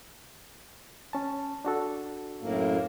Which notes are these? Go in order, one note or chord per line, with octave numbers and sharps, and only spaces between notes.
C#4 A5
D4 F#4 A4
F#2 A2 A#3